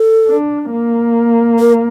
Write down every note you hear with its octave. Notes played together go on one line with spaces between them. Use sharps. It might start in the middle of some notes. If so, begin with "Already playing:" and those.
Already playing: A4
D4
A#3
A#4